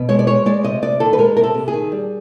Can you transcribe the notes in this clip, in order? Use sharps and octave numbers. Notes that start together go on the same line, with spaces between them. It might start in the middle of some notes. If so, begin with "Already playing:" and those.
Already playing: B2
G#3 C#5
D5
G#3 C#5
G#3 D5
C3 D#5
C3 D5
D#3 A4
B4
G#3 A#4
C3 A#4
A4
C3
G#4
D#3
G3